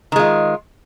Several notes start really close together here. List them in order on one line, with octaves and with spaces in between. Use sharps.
D#3 G#3 F4